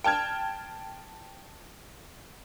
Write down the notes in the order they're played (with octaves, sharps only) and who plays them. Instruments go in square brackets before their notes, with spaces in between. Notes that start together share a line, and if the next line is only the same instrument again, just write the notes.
[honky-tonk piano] G5 A5 F6 G#6